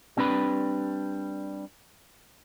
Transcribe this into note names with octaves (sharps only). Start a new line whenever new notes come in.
G3 C4 D4 B4 B5